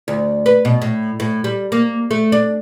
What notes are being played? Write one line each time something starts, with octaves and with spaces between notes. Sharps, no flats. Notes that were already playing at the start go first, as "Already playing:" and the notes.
D2
B4
B2
A2
A2
G3
A#3
A3
D4